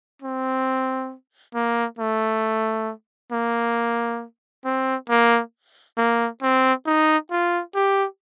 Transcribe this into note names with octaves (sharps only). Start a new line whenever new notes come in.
C4
A#3
A3
A#3
C4
A#3
A#3
C4
D#4
F4
G4